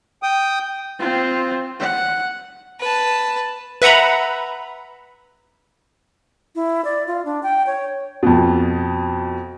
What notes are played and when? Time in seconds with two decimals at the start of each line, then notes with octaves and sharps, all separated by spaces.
0.23 G5 D#6
0.99 C4 F4
1.79 F#5
2.80 B4 A5
3.82 B4 E5 F#5 A#5 B5
6.55 E4
6.85 D5
7.07 F4
7.25 D4
7.43 G5
7.66 C#5
8.23 F2 B2